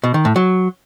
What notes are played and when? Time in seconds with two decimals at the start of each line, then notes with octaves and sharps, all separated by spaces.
0.03 B2
0.14 D#3
0.25 A2
0.36 F#3